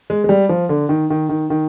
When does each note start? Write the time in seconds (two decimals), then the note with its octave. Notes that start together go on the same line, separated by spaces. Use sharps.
0.10 G#3
0.24 G#3
0.29 G3
0.49 F3
0.69 D3
0.89 D#3
1.10 D#3
1.29 D#3
1.50 D#3